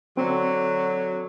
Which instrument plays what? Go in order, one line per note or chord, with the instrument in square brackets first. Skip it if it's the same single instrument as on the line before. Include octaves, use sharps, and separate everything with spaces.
[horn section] D3 F#3 [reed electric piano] C4